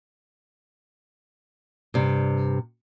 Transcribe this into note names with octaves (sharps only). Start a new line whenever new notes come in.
G2 C3